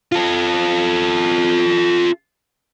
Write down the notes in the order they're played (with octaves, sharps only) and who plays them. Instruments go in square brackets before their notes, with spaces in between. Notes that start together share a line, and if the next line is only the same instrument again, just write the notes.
[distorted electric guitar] F4 A4